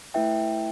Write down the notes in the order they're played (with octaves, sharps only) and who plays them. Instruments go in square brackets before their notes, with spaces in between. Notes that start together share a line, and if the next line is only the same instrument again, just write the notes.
[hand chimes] A3 E4 B4 E5 G5